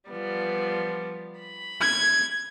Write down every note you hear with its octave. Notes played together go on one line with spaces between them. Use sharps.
F3 G3 B3
B5
G#6